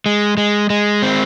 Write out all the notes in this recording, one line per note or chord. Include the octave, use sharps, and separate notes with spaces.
G#3
G#3
G#3
C4